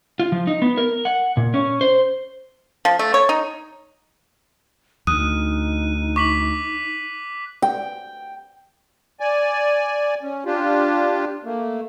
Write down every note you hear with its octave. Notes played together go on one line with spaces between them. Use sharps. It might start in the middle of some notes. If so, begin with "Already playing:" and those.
F4
F3
D#4
B3
A#4
F#5
A#2
C#4
C5
F3
A3
C#5
D#4
D2 D#4 D#6 F#6 D#7
C#6 D6 B6 F#7
G5
D5 G#5
C#4
D4 F4 G4
A3 A#3